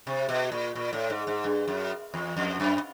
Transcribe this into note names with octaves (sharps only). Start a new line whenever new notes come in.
C3
B2
A#2
A#2
A2
G#2
G#2
G2
F#2
E2
F2
F#2